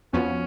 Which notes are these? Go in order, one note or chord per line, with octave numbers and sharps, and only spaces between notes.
F2 F3 B3 C#4 F#4